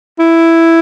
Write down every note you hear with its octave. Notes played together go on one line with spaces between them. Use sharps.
E4